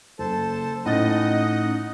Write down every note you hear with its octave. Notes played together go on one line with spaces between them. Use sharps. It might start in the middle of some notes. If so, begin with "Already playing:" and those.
F#1 A4 C5 A5
A2 C#4 D#4 D#5 F#5 A6 A#6